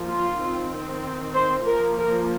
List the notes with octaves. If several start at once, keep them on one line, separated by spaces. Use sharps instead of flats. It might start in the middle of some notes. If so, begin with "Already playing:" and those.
Already playing: F3 A#3
F4
D#3 C4
C5
F3 A#3 A#4
A#4